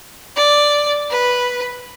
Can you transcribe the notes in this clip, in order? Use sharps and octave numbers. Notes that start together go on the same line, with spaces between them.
D5
B4